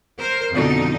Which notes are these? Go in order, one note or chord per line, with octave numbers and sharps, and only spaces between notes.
A#4 C5
F2 B2 D3 F3 D#4